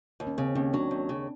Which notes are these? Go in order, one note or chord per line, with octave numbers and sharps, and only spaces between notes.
D#2
C#4
C#3 C4
D#2 C#4
F#3 D4
D#2
C#3